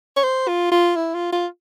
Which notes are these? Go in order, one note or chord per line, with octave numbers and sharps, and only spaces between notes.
C#5
C5
F4
F4
E4
F4
F4